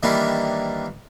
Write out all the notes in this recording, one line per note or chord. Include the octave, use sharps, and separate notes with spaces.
D#3 E3 G3 A#3 D4